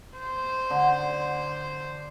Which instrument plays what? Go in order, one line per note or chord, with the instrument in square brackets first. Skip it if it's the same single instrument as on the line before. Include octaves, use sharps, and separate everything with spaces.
[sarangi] C5
[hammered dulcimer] D3